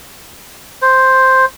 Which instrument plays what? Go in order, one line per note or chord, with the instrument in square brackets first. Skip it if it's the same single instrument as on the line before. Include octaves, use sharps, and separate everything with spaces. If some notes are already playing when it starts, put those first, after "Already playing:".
[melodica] C5